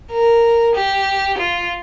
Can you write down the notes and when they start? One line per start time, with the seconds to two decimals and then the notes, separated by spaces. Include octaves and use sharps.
0.11 A#4
0.75 G4
1.38 F4